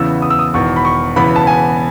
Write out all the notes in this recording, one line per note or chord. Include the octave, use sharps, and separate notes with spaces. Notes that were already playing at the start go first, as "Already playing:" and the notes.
Already playing: E2 C#3 E3 B3 E6
D#6
E6
D#6
E1 E2 D#3 C#6
B5
C#6
E1 E2 C#3 E3 B3 B5
A5
G#5